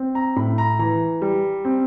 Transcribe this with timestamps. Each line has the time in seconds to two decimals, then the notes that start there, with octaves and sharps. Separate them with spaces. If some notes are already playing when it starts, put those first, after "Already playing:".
Already playing: C4
0.15 A#5
0.36 A2 B5
0.58 A#5
0.79 E3 A#5
1.22 G3
1.65 C4